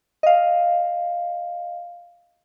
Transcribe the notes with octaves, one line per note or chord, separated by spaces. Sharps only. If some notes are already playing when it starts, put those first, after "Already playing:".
D#5 F5